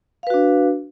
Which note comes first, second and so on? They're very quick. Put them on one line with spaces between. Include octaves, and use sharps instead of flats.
F5 B4 F#4 D4